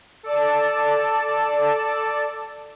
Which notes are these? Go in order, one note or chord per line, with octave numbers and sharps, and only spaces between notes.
A4 D5 A5